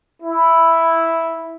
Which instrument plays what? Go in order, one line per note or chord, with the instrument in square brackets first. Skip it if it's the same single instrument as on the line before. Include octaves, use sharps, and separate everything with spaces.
[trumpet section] E4